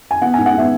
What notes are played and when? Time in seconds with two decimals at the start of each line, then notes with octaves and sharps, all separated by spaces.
0.11 G#5
0.22 B3 F#5
0.34 G#2 G#5
0.46 F#5
0.54 B3 E5